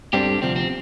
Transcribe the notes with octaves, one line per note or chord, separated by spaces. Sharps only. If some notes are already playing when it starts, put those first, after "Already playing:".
G2 G3 C4 D4 G4 A4
D2 C3 F3 C4
C4